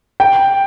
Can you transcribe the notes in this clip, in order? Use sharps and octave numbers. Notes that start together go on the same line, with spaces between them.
G5